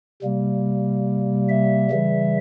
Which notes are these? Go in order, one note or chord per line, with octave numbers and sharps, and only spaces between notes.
C3 G3 A#3
E5
C#3 E3 G3